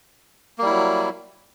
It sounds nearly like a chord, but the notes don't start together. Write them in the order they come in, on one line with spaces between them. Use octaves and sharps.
A#3 G3 E4 F#3